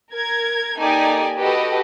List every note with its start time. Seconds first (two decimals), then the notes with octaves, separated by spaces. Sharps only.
0.14 A#4 G#6
0.80 A#3 D#4 G4 A4 D5 G#5
1.38 F#4 G4 A4 B4 D#5